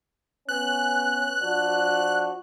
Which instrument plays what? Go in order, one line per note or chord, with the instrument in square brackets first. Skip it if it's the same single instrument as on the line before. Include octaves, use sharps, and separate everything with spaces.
[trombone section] B3 C#4 [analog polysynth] F#6
[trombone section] F3 D4 F#4